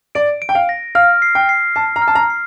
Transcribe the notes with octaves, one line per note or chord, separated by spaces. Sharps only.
D5 D7
D7
G5
F5
A#6
F5 F6
C7
G5
C7
A5 C7
A#5
F6
A5
A#5
C7